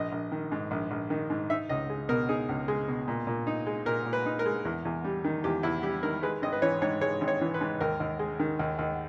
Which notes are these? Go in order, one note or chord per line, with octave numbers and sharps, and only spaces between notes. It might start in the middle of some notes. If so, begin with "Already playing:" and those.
Already playing: A#1 D#5
A#1
D#3
G#2
A#1
A#1
D#3
G#2
D#4 E5
C#2 D#5
G#3
B2 A#4
D#4 G#4
C#2
G#3
B2
A#2
A#2
D#4
G#3
A#2 A#4
A#2
B4
D#4
A#4
G#3
E2
E2
G3
D#3
E2 G4
E2 E4
G3 G4
D#3 A#4
G#3 B4
G#1 D#5
B4
E3 C#5
G#2 C#5
G#3 C#5
G#1
C#5
E3
B4
G#2
D#2 A#4
D#2
G#3
D#3
D#2
D#2